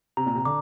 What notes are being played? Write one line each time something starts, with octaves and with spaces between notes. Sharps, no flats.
C3 A#5
A#2
C3
D3 D6